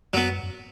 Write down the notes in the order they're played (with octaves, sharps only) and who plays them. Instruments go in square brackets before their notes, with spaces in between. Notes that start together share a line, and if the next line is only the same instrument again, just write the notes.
[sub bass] F#2 [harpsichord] F#3 B3
[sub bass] F#2